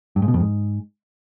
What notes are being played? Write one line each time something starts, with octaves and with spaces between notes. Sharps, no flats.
G2
G#2
B2
F2
G#2